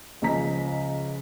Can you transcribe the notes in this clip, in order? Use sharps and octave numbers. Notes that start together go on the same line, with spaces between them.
C#2 C#3 F3 D#5 A#5 B6